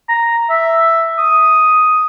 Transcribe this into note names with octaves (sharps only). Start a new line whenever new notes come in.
A#5
E5
D#6